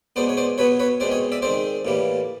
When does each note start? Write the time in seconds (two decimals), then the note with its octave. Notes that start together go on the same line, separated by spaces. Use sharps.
0.16 B2 G#3 B3 C5 D5
0.29 C#5
0.37 C5 D5
0.58 B2 F#3 B3 B4 C#5
0.80 B4 C#5
1.00 B2 G#3 C4 C5 D5
1.11 C#5 D#5
1.32 D5 E5
1.42 D#3 G#3 C4 C5 D5
1.85 A2 E3 G3 A#3